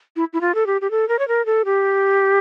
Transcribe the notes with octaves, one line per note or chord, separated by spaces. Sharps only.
E4
E4
F4
A4
G4
G4
A4
A#4
C#5
A#4
A4
G4